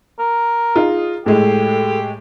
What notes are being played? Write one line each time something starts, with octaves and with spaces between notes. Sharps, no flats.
A#4
D#4 F4 G#4
A2 G#3 G4 A4